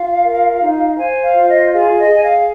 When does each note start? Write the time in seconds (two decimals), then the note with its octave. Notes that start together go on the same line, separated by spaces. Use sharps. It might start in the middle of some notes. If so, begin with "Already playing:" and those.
Already playing: F4 F5
0.23 A#4
0.60 D#4
0.98 C5 G#5
1.22 F5
1.35 F4
1.48 D#5
1.72 G#4 F5
1.98 D#5
2.10 G#4 G#5
2.22 F5